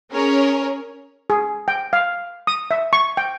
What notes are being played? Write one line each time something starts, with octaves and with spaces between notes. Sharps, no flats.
C#4 G#4 A#4 C#5
G#4
G5
F5
D#6
E5
C#6
G5